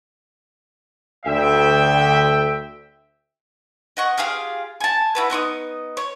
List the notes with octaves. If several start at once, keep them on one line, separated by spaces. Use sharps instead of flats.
D2 E5 G5
D#5 F#5 C#6
F4 G4 G#4 F5
G#5 A5
E4 F#4 B4
B3 D#4 C#6 D#6
C#5